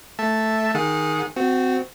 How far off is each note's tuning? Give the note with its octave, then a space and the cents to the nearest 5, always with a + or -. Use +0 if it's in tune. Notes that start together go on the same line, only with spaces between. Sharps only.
A3 +0 E5 +0 A5 +0
D#3 +0 G#4 +0 F#5 -40
C4 -20 F#4 +0